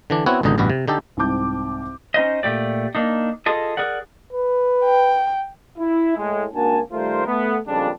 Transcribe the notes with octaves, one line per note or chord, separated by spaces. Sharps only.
D3 E3 D4
B3 C4 E4 F#4 C#5 F#5
G#1 C#2 B2 D3 D#4 D#5
A1 G2 B2 F#4 B4
C3
D3 D#4 G4 A4
C2 G#2 C4 A5 D6 G6
C#4 D#4 C5 D#5
A#2 A3 G4 D5
A#3 D4 D#4
F4 G#4 A4 D#5
G#4 A#4 D5 F#5
B4
G5
E4
A2 G#3
C#2 A#3 D4 F#4 G#5 A5
D#3 G3 A3 F4 A#4 C5
A3 B3
F2 A#2 C#3 G3 G#3 D4